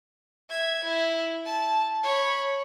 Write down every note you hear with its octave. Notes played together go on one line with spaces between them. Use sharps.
E5 G#6
E4
A5
C#5 B5